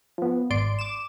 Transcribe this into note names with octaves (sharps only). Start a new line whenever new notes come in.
F3 B3
G#1 D5 C6 D7
D6 E7